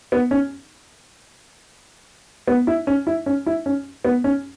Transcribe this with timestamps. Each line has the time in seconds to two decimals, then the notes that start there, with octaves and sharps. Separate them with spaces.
0.12 B3
0.31 C#4
2.48 B3
2.67 E4
2.87 C#4
3.07 E4
3.26 C#4
3.46 E4
3.66 C#4
4.05 B3
4.24 C#4